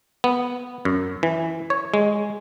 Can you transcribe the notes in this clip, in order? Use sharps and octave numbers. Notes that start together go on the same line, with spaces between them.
B3
F#2
E3
C#5
G#3